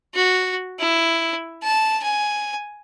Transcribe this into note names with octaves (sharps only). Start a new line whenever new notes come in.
F#4
E4
A5
G#5